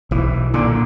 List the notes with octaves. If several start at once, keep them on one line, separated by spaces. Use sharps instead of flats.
B1 E3
A#2 D3